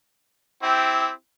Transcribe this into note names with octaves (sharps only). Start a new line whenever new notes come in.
C4 E4 G4